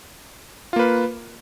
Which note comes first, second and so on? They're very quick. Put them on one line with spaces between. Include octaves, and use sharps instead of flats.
F4 A#3 B4